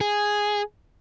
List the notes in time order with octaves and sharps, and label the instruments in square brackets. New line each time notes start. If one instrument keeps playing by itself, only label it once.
[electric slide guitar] G#4